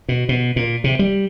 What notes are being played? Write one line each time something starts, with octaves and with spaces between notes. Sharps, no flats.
B2
B2
A#2
C3
G3